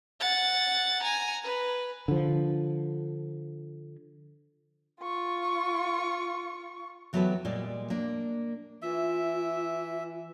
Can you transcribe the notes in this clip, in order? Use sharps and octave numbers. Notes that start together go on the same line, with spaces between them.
F#5 A6
G#5 A#5
B4
D3 F3
F4 C#6
E3 F#3 B3 G4 A4 B4
A#2 G3 G#3
A#3 D4
E3 F4 E5